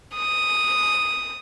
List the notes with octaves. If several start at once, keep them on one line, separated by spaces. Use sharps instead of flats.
D#6